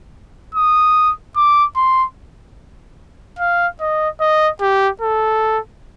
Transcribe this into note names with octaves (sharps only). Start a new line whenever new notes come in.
D#6
D6
C6
F5
D#5
D#5
G4
A4